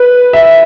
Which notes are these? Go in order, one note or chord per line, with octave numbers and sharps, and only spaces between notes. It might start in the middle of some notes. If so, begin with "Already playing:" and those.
Already playing: B4
E5